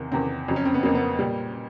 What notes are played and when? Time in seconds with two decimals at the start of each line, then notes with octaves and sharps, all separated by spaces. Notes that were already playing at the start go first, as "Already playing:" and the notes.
Already playing: E2 C3 D#3
0.12 E2 C3 D#3 C4
0.48 F2 C#3 F#3
0.56 C#4
0.65 C4
0.74 B3
0.83 F2 C#3 F#3 A#3
0.95 B3
1.01 A#3
1.19 A#2 G3